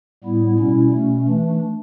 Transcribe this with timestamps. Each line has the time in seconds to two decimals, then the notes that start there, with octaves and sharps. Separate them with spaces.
0.23 A2 G3 B3 E4
0.58 B2 G3 C#4 E4
0.93 B2 A3 C#4
1.28 E3 A3 D4